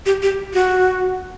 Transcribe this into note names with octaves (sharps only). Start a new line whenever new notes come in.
G4
G4
F#4